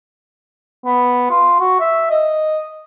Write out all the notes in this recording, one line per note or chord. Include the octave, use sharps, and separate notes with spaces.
B3
F4
F#4
E5
D#5